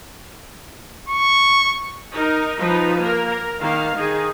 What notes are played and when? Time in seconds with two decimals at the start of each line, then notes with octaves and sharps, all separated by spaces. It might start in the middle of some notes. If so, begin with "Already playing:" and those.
1.09 C#6
2.13 D#4 A#4
2.59 F3 D#4 B4
3.00 A#3 A#4
3.30 A#4
3.59 D#3 A#3 F5
3.96 D#3 D#4 G#4